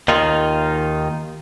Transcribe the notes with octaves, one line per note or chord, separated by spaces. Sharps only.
D#2 D#3 D#4 F4